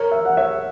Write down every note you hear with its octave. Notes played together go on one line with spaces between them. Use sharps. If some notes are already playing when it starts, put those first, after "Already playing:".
Already playing: A#4 C#5
E5
F#5
C#5 E5